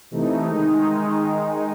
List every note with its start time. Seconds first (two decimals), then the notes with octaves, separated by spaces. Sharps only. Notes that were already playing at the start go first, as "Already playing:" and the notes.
0.11 C3 E3 A3 D#4
0.47 D#3 G#3 D#4